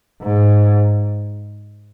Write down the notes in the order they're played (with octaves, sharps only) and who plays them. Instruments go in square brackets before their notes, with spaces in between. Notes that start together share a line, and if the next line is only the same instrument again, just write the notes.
[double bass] G#2